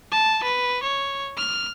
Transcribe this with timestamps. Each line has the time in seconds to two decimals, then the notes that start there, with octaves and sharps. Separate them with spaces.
0.12 A5
0.44 B4
0.83 C#5
1.37 F6